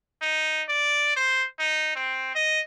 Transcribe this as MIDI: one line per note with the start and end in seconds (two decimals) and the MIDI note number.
0.22 0.63 63
0.69 1.14 74
1.16 1.46 72
1.59 1.93 63
1.96 2.31 60
2.35 2.61 75